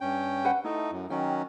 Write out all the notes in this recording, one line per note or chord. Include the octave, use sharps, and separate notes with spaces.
G2 C#4 G5
B4 F#5
A3 D#4 E4 A5
F#2
D#3 F#3 C#4 G5